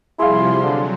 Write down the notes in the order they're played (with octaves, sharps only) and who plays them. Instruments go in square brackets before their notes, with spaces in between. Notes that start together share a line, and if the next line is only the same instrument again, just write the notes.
[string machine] C3 F3 G3 [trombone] E4 [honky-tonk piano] G#4 F5 [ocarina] C6
[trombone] D3 [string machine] F#3